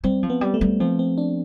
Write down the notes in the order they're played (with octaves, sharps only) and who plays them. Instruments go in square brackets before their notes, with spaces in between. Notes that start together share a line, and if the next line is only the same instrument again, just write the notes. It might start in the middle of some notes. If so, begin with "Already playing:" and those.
[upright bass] G3 [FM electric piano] C4
[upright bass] F3
[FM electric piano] B3
[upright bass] G3
[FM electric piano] A3
[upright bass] G3
[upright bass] F3 [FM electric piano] C4
[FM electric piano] C4
D4